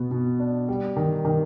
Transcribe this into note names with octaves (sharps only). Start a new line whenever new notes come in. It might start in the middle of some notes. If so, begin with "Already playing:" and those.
Already playing: B2 B3
B2
D4
G3
D#3
D#3